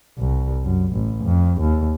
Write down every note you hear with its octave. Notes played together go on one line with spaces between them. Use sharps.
C2
F#2
A1
F2
D#2